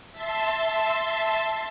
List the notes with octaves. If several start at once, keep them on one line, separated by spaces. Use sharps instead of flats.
E5 A5 C6